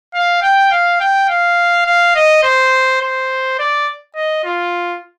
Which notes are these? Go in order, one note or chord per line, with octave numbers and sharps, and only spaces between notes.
F5
G5
F5
G5
F5
F5
D#5
C5
C5
D5
D#5
F4